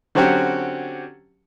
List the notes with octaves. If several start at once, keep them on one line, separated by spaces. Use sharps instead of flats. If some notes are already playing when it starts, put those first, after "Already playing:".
D3 F#3 C4 C#4 F#4 G4